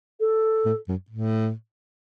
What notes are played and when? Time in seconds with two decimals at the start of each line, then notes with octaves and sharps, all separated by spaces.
0.20 A4
0.65 A2
0.88 F#2
1.10 A2